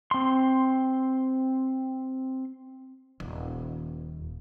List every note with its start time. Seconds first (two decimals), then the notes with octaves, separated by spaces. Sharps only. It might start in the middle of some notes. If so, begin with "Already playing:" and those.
0.11 C4 C6
3.20 D#1